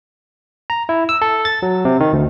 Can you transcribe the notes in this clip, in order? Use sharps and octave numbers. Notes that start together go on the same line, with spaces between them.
A#5
E4
E6
A4
A6
F#3
C3
D#3
D2